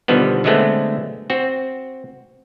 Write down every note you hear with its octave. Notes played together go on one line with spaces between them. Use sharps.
B2 D3 D#3 F3 G3 B3
D3 F#3 G#3 A3 B3 C4
C4 F#4